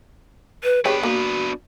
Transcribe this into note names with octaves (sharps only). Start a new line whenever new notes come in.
B4
B3 D4 G4 G#4 B4 C#5
A#3 F#4